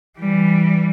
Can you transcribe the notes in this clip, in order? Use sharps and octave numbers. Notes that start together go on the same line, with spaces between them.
E3 G3